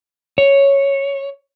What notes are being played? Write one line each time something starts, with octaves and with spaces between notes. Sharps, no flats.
C#5